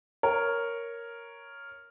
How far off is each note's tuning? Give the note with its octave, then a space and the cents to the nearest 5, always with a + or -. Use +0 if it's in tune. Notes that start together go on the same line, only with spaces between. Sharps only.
A#4 +0 C#5 +0